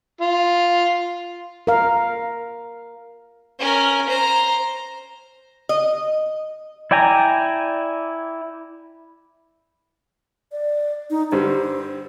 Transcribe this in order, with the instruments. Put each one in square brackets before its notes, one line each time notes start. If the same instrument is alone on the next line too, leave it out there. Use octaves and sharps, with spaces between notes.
[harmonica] F4
[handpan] A#4 F5
[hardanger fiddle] C#4 A#4
C5 A#5
[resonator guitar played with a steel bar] D#5
[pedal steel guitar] E4 D5 G5 G#5 A#5
[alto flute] D5
D#4
[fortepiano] G2 D3 G3 [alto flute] C5